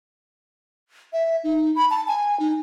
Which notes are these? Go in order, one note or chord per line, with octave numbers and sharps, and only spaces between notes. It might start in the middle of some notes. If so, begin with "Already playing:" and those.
E5
D#4
B5
A5
G#5
D#4